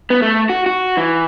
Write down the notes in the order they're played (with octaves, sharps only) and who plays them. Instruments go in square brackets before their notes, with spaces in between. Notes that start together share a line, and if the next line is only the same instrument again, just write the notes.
[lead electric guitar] B3
A3
F#4
F#4
E3